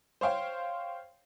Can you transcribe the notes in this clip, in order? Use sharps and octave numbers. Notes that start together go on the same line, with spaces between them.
C5 C#5 F5 G5